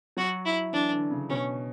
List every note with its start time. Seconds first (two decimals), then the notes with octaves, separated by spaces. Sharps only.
0.17 F#3 F#4
0.46 E4
0.73 E3 D4
0.92 D3
1.11 C#3
1.30 B2 C#4